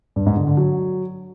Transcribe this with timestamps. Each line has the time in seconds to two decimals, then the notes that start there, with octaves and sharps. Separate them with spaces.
0.16 G2
0.26 G#2
0.37 D3
0.47 D3
0.57 F#3